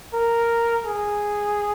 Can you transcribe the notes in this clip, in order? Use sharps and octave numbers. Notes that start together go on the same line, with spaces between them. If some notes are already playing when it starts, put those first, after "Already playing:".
A#4
G#4